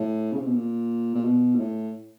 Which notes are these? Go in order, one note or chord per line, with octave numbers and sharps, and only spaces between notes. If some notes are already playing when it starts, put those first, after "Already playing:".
Already playing: A2
C#3
C3
B2
A#2
A#2
B2
A#2
A2